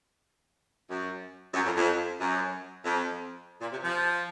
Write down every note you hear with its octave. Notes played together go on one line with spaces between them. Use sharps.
F#2
F#2
F2
F2
F#2
F2
A#2
C3
F3